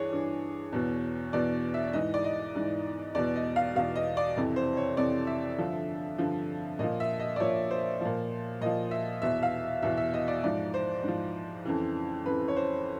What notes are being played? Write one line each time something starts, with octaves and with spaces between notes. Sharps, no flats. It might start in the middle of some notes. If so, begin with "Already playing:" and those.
Already playing: G2 E3 D4 G#4 C#5
G2 E3
E2 B2
E2 B2 D5
E5
G#2 E3 D#5
D5
D#5
G#2 E3
E2 B2 D5
D#5
F5
E2 B2 F5
D#5
D5
F2 C3 E3
C5
C#5
F2 C3 E3 D5
E5
G2 D3 F3
G2 D3 F3
A#2 F3 D#5
E5
D#5
D5
A#2 F3 C#5
C5
A#2 F3
A#2 F3 D#5
E5
E2 B2 E5
F5
E2 B2 E5
E5
D#5
D5
G#2 F3 D5
C5
G#2 F3
F2 C#3 E3
F2 C#3 E3 B4
C#5
C5